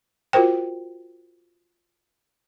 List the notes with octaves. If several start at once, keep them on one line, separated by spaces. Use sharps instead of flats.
F4 F#4 A#4 C5 G5